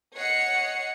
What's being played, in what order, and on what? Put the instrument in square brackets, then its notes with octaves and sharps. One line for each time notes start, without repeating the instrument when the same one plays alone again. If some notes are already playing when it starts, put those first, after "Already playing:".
[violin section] C#5 D#5 F#5 C7 C#7